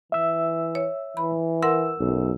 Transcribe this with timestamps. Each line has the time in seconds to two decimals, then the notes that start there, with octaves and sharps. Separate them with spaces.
0.12 E3 E5 E6
0.75 C#5
1.17 E3 B5
1.63 A#4 F#5 C6 E6
2.00 B1 F#2